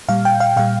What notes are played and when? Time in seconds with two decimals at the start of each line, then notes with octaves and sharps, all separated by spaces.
0.09 A#2 G3 F5
0.25 G5
0.40 F5
0.56 A#2 G3 F5